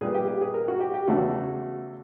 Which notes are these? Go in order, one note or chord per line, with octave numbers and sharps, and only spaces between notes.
A#2 G3 B3 G#4
G4
G4
G#4
A#4
F#4
G4
G4
E2 C#3 E3 A3 F#4